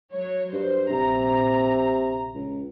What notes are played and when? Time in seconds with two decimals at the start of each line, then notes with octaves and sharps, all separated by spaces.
0.12 F#3 C#5
0.53 G2 C5
0.90 A#1 C3 A#5
2.35 C#2